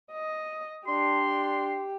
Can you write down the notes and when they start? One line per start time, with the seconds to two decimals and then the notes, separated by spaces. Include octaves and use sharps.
0.11 D#5
0.87 D4 G4 C6